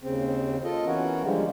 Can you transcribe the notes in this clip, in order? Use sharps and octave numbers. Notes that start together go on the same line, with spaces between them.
D#2 C#3 C4
F4 A4 D#5
E3 B3 C#4 F#4 A#4
D3 F3 G3 G#3